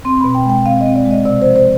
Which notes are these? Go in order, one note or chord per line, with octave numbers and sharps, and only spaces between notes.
C4 C6
B2 B5
G5
G#3 G5
C4 F5
D#5
C4
D5
G#3
D#5
C3 D5
F3 C5
C5